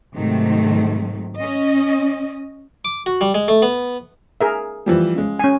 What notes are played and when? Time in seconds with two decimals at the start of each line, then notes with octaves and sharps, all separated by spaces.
0.15 G#2 C3 D#3 F#3 A3
1.37 C#4 D#5
2.85 D6
3.06 F#4
3.21 G3
3.34 G#3
3.48 A3
3.62 B3
4.41 G#4 A#4 E5
4.86 E3 F3 G3
5.15 C#3 G#3
5.39 C#4 G#5